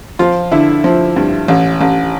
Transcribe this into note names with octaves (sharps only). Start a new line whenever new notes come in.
F3 F4
D3 E4
F3
G2
A1
A1